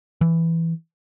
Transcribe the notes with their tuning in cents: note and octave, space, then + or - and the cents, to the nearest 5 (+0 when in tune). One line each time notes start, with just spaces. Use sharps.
E3 +0